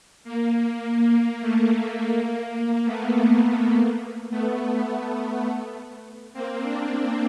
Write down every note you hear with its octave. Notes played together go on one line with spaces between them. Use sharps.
A#3
A#3
A3
A3
A#3
A#3
A3 B3
A#3
A3 B3
A3 B3
A#3 C4
C4 D4
C4 D4